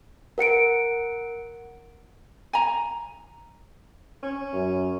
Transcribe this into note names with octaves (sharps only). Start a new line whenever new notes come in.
A#4 F#5 C#7 D7
G#5 A#5
C#4
F#2